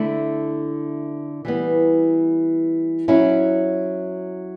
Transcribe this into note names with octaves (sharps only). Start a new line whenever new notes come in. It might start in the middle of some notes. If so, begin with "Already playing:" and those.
Already playing: D3 A3 E4
E3 G3 B3
F#3 C#4 E4